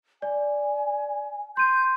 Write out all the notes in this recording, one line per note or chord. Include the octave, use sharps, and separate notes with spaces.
D5 G#5
C6 G6 D#7